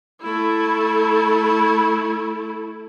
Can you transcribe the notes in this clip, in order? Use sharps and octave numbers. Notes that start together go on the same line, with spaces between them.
A3 E4